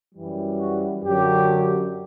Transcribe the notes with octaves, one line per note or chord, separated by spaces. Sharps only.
F#2 E3 G3
F#4
F#2 D3 F#3 G4